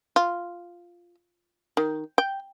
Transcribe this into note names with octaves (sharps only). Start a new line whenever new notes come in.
F4
D#3
G5